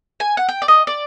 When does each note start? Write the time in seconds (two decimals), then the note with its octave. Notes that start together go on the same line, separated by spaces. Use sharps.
0.20 G#5
0.37 F#5
0.49 G5
0.62 D5
0.68 D#5
0.87 D5